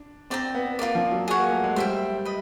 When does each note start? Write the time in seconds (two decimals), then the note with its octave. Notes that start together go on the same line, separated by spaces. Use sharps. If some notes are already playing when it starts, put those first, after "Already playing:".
Already playing: D4
0.30 C4 D5 G5 A#5
0.54 B3
0.79 A#3 F4 A#4 D5
0.95 F3
1.12 F#3
1.28 G#4 C#5 F#5
1.38 A#3
1.51 A3
1.64 G#3
1.76 G3 C5 E5 G5
2.25 B4 D#5